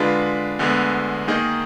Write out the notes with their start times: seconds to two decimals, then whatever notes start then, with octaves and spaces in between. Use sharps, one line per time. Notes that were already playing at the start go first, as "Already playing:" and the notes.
Already playing: D3 G#3 D4 F4 B4
0.59 D2 D3 G#3 B3
1.28 D#3 A#3 D#4 G#4 D#5